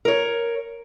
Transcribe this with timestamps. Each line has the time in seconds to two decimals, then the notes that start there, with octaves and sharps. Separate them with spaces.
0.05 A#4 C#5